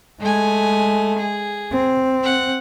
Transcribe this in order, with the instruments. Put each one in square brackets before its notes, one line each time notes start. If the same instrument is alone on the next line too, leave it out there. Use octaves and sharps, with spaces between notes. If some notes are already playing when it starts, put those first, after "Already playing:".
[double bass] G#3 [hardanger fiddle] A3 G#5
[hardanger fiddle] G#4
[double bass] C4
[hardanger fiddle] F#5